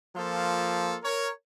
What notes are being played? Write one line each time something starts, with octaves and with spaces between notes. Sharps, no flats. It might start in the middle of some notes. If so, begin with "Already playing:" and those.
F3 A#3 F4 A4
A#4 C#5